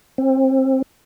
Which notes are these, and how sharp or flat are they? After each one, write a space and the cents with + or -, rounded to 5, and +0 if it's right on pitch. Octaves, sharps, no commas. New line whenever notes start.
C4 +25